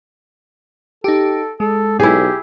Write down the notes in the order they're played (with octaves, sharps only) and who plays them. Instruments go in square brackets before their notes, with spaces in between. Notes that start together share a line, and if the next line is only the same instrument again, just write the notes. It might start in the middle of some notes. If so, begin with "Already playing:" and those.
[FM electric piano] D#4 G4 [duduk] A4
[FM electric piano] G#3 [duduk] A4
[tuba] B1 [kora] E4 G#4 [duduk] G4